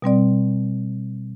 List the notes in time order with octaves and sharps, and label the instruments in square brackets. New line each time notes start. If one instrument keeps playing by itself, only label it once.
[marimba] B2 G3 C4 D5